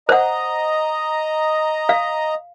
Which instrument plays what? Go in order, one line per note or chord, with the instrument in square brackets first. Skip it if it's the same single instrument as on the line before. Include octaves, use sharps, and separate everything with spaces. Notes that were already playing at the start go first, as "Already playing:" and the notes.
[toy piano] C5 F#5 [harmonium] D#5 A#5
[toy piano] F5